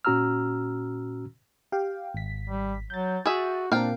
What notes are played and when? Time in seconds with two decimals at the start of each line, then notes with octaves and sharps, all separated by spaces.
0.05 A#2 C#4 F#4 A#5 E6 F6
1.72 G4 F5 G5
2.15 G#1 B6
2.50 G3
2.90 F#3 G6 A6
3.26 F#4 G#4 E5
3.72 A#2 C4 D4 A#4 F5 G5